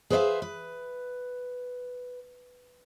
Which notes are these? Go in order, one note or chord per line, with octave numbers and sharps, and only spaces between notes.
G#4 B4 C5 D5 E5 F5
B4